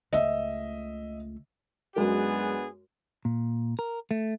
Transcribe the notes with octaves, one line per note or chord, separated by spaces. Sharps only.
C#2 A3 D#5 E5
F#2 G#3 B3 D4 G#4 A#4
A#2
A#4
A3